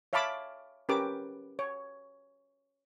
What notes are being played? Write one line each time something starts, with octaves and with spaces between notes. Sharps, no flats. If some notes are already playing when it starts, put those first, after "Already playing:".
C#5 E5 F5 A5 B5 D6
C#4 G4 A#4 B4 D6
C#5